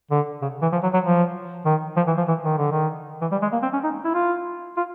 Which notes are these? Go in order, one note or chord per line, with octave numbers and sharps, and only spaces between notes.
D3
C#3
E3
F3
F#3
F#3
F3
D#3
F3
E3
F3
E3
D#3
D3
D#3
E3
G3
G#3
A#3
C4
C#4
D#4
E4
F4
F4